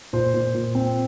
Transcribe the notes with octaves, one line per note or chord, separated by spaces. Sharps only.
A#2 C5
A#2
A#2
C4